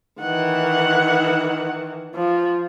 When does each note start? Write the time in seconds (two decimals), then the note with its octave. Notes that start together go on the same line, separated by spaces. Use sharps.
0.21 D#3 E3 F#5
2.15 F3